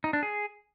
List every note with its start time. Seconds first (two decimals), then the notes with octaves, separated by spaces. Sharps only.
0.04 D#4
0.13 D4
0.23 G#4